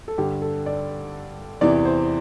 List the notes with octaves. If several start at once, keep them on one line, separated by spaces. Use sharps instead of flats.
A4
G2 D3 G4
A4
D5
E2 C3 E3 D5
C5